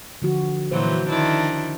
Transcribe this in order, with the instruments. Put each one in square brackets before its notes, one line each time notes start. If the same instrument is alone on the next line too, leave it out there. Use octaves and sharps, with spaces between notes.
[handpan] D3 F3 F#4
[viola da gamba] A#2 E3 F#3 [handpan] C5
[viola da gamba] D#3 D4 E4